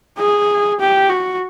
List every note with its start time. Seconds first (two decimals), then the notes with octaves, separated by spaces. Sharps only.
0.18 G#4
0.80 G4
1.09 F#4